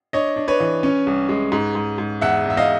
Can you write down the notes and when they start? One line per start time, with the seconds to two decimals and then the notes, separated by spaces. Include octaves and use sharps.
0.13 D4 C#5 D#5
0.36 D4
0.48 B4 C#5
0.60 E3
0.83 C#4
1.07 C2
1.29 G#3
1.52 G#2
1.75 G#2
1.98 G#2
2.21 E2 E5 F#5
2.45 E2 E5
2.57 D#5 F5